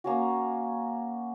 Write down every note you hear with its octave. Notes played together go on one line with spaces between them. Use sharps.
A#3 C#4 F#4